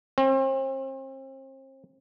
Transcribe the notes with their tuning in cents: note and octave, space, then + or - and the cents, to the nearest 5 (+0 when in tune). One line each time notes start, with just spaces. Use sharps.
C4 +40